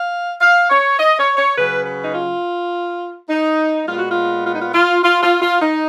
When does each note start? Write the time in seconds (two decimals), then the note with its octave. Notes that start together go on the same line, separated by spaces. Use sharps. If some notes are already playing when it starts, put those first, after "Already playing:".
Already playing: F5
0.41 F5
0.70 C#5
0.99 D#5
1.18 C#5
1.37 C#5
1.56 C#3 F#3 C#4 B4
1.85 B4
2.03 D#4
2.15 F4
3.30 D#4
3.87 A#2 G#3 B3 F4
3.99 F#4
4.11 F4
4.46 F4
4.53 D#4
4.62 F4
4.74 F4
5.03 F4
5.23 F4
5.42 F4
5.61 D#4